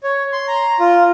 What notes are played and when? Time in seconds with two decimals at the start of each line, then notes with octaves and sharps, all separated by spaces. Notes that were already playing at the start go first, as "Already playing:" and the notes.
0.03 C#5
0.32 C6
0.48 A#5
0.80 F4